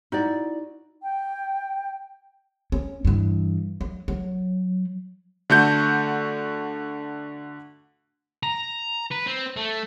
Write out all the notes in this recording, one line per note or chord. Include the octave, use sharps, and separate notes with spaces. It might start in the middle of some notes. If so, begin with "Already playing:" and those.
D#4 E4 F#4 D5
G5
C#4
G2 E3
F#3
F#3
D3 A3 F#4 G6
A#5
B4
C4
A3